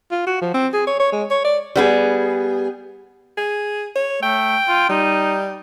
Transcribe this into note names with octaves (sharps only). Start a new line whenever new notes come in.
F4
F#4
F3
C4
G#4
C#5
C#5
G#3
C#5
D5
G3 B3 G#4
G#4
C#5
A3 G5
F4
G3 D#4